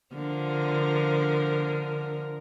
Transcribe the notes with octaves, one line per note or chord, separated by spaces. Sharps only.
D3 F3 A#4